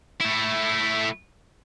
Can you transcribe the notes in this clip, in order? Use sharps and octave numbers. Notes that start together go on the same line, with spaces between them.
A3 E4